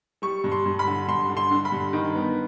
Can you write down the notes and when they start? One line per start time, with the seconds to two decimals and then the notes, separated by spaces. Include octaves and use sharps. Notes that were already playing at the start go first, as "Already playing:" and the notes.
0.22 G3 C#6
0.44 G2
0.52 C6
0.65 G2
0.79 B5
0.87 D3
1.08 G2 C6
1.29 D3
1.37 C6
1.51 D3
1.65 B5
1.72 G2
1.93 D#3
2.15 B3